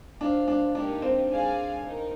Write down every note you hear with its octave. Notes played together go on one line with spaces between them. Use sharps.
D4 F4 C5 F5
D4
A#3 D4 D#4 G4 A#4
C4
G#4 D5 F5 G#5
D#4 A#4